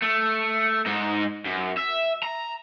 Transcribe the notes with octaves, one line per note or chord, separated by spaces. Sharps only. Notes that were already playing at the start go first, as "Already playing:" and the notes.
A3
G#2 D#4
F#2
E5
A#5